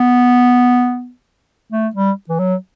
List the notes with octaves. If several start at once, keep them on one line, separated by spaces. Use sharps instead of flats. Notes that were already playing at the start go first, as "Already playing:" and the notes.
Already playing: B3
A3
G3
E3
F#3